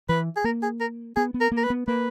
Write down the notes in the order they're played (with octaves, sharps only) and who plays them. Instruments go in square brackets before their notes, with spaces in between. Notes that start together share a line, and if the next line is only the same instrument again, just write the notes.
[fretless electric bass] E3 [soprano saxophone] B4
[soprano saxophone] G#4
[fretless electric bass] A#3 [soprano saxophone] A#4
[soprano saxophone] G#4
A#4
[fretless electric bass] B3 [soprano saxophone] G#4
[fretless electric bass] B3
[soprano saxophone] A#4
[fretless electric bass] A#3
[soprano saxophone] A#4
B4
[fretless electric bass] B3
[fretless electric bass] A#3 [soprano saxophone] B4